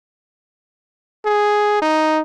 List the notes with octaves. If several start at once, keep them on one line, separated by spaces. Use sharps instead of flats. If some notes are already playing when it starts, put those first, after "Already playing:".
G#4
D#4